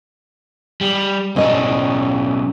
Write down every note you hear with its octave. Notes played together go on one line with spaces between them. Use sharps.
G3
B1 C#4 D4 D#5